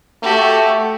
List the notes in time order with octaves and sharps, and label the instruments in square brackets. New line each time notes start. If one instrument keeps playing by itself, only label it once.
[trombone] A3 [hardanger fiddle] F#4 G4